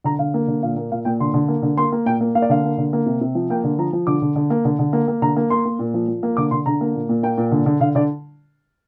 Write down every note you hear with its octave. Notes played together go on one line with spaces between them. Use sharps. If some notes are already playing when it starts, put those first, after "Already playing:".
D3 A#5
D3 F5
A#3
D3
A#2 F5
A#3
A#2 F5
A#2 G5
D3 C6
D3
A#3
D3
A#3 C6
A#3
A#2 G5
A#3
A#3 F5
D5
D3 F5
A#3
D3
A#3
C3
C3
F3
A#3 G5
D3
F3 A#5
F3
D3 D6
D3
D3
A#3
D3
D3
A#3
A#3
D3 A#5
A#3
A#3 C6
A#3
A#2
F3
F3
A#3
D3 D6
D3 C6
D3 A#5
A#3
A#2
A#2
A#3 G5
A#2
D3
D3
D3 F5
D3 D5